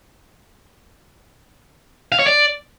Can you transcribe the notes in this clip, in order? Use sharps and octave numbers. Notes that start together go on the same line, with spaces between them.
F5
C#5
D5